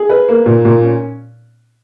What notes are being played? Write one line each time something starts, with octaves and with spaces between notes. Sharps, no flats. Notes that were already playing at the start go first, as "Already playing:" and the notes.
Already playing: G#4
B4
A#3
A#2
A#2
C#4